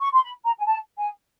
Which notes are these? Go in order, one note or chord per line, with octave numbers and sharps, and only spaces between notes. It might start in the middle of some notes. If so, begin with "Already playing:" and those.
C#6
C6
B5
A#5
G#5
A5
G#5